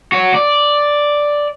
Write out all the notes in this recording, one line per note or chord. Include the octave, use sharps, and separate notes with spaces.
F#4 C#5
D5